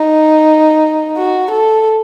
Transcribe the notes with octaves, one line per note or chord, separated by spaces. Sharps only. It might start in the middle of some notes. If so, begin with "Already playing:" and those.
Already playing: D#4
F#4
A4